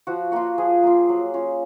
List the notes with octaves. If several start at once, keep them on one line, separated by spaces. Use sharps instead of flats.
F3 F#4
A#3 F4 F#4
F3 G#4
A#3 F4
F#3
C#4 F4